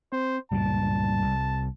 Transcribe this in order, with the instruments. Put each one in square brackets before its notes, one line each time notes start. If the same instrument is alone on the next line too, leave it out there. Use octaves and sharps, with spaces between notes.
[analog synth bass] C4 [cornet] C5
[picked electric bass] C#2 G2 A#2 [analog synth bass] G3 [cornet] A5
[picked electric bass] C2